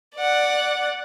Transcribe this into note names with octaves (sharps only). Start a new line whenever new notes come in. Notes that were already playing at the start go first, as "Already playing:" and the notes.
D5 F#5